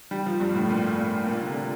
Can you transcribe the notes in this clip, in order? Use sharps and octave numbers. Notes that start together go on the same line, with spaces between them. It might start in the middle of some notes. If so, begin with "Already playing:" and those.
G3
F3
G2
A2
A#2
A#2
A#2
D3
C3